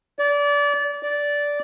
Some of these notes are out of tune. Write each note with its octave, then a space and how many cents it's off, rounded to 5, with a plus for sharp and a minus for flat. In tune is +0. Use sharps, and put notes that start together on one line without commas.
D5 -25
D5 -10